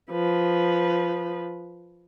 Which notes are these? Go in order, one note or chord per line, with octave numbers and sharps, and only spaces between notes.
F3 B4